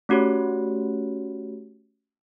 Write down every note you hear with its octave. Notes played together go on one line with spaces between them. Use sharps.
A3 C#4 F#4 G4 C#5